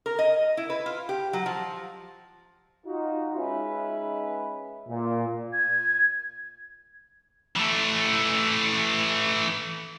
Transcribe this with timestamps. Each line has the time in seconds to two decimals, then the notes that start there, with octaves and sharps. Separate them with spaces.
0.06 A#4
0.19 D#5
0.57 E4
0.70 B4
0.86 F4
1.09 G4
1.33 F#3
1.46 F3
2.86 D#4 F4 F#4
3.35 G#3 C#4 D#4 G#4 B4 E5
4.88 A#2
5.53 G#6
7.56 E3 A3